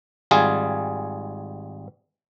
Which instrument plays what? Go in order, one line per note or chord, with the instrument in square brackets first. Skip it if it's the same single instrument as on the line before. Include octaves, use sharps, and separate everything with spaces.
[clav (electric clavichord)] G#1 G3 F4 G#4 G#5